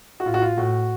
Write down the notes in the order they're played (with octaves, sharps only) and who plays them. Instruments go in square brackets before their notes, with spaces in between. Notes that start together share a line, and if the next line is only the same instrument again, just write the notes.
[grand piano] F#4
[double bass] A2 [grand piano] F4
[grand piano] F#4
F4
[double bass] A2 [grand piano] F#4